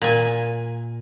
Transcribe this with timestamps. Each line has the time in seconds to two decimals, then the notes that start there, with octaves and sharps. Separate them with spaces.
0.02 A#2 G#5